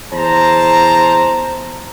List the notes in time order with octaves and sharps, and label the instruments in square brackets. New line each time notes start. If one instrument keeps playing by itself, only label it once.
[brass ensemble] E2 C5 A5 A#5